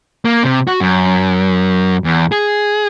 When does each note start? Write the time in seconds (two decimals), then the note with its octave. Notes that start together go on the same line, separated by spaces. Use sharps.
0.25 A#3
0.43 C3
0.67 F#4
0.81 F#2
2.04 E2
2.32 G#4